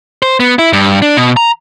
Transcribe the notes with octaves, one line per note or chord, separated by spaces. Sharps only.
C5
B3
E4
G2
D4
B2
A#5